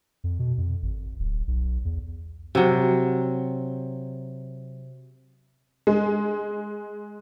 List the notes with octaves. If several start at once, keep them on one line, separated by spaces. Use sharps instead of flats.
F2
B2
F2
G#1
D1
B1
E2
C3 F#3
G#3